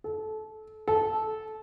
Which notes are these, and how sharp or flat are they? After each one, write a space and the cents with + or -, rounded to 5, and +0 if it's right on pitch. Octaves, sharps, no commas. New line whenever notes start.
A4 -25
A4 -15